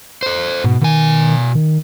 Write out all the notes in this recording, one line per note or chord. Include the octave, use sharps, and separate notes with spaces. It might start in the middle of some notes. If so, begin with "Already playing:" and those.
A4 C5
G#2 B2
B2 D#3 G#5
D#3